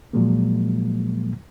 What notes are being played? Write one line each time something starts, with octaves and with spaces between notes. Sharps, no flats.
A#2 F3 F#3 G#3 A#3